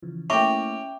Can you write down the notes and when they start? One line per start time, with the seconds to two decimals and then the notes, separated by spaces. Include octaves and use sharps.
0.02 C#3 E3 F3
0.30 A3 A#3 C#4 E4 E5 G5 C#6 D6